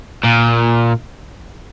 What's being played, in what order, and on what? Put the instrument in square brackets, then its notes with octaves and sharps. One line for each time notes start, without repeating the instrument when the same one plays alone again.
[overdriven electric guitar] A#2